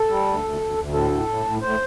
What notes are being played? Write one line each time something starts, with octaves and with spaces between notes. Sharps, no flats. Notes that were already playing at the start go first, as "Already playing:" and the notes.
Already playing: A4
G3
D2
D2
D2
D2
A2 A4
A2
A2
A2
A2 C5